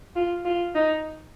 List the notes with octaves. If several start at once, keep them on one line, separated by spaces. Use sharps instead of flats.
F4
F4
D#4